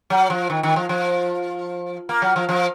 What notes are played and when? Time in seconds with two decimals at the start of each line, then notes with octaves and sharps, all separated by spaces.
0.10 F#3
0.30 F3
0.50 D#3
0.63 D#3
0.76 F3
0.89 F3
2.09 A#3
2.22 F#3
2.36 F3
2.49 F3